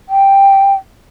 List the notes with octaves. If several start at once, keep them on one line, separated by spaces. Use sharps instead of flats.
G5